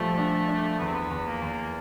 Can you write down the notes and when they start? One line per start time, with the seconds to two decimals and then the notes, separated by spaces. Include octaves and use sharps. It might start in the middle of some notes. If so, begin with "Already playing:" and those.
Already playing: A#1 F3 G3 A3
0.17 D4
0.48 D4
0.79 E2 B3
0.86 C4
0.94 B3
1.11 E2
1.26 A#3
1.42 E2